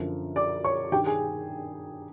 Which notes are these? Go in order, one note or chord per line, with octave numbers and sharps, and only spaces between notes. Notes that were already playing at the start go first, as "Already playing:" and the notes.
Already playing: F#2 D3 F3
D5 D6
C#5 C#6
G2 D#3 G4 G5
G#4 G#5